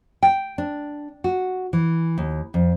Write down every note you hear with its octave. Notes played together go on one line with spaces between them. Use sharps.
G5
D4
F#4
E3
D#2
F2